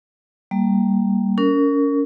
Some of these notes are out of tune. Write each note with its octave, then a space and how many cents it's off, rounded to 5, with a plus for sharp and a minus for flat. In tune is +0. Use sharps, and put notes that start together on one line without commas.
G3 +0 A#3 +0
C#4 +30 A#4 -15